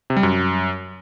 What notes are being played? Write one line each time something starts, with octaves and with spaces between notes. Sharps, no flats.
C3
G3
F#2